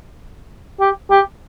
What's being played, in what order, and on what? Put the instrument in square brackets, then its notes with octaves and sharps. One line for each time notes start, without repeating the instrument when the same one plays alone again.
[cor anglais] G4
G4